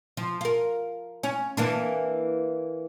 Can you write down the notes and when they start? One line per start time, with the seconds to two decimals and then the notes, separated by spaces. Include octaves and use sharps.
0.17 F3
0.41 F4 A#4
1.23 C#4
1.57 E3 A#3 D4